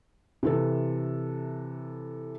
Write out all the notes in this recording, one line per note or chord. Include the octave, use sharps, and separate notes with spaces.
C3 E3 A4